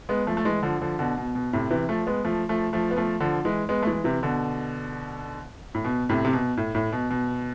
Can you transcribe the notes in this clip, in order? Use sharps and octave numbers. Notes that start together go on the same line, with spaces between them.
G#3 B3
F3 A3
A3
E3 G#3
D3 F3
D3 F3
B2 D3
B2
B2
A2 C3
C3 E3
F3 A3
G#3 B3
F3 A3
F3 A3
F3 A3
B3
F3 A3
D3 F3
E3 G#3
G#3 B3
A3
E3 G#3
C3 E3
B2 D3
A2
B2
A2 C3
C3
B2
A2
A2
B2
B2